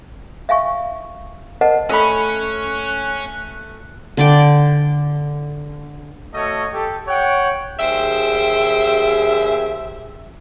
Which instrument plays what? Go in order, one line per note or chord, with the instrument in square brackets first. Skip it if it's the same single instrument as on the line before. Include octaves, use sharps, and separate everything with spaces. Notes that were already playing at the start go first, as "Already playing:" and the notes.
[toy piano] E5 F5 G#5 C#6
A#4 C5 D#5 F#5 A5
[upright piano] A3 [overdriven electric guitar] C#4 [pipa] D#5 B5 [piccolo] F#6
[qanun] D3 D5 G5
[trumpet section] A3 F#4 A4 C#5 D#5
G4 A4
C#5 F#5 G5
[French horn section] D#2 G4 G#4 [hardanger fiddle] C5 G5 [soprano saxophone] E5